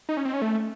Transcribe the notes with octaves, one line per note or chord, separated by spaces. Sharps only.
D#4
C#4
C4
C#4
A3